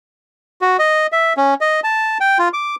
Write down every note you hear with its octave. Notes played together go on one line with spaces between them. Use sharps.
F#4
D#5
E5
C#4
D#5
A5
G5
F4
D6